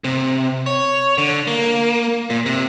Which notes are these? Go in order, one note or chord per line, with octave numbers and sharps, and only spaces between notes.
C3
C#5
D3
A#3
A#2
C3